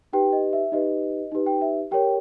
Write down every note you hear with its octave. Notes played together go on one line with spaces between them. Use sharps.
D#4 G4 B4 G5
D#5
E5
D#4 G4 B4 D#5
D#4 G4 B4
G5
E5
G4 A#4 C#5 G5